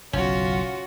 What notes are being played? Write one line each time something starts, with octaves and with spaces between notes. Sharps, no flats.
F#1 B1 C#4 F4 F#4